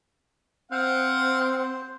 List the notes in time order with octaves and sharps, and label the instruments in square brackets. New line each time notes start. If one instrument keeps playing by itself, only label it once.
[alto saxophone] C4 [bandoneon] C5 [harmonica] F5 F#5